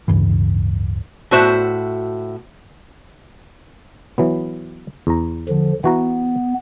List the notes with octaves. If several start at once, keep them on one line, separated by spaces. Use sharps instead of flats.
D1 G2 C#3 E3
A2 F#4 C5 E5
E3 F#3 B3
E2 A#5
D3 F3
E3 B3 F#4 A#5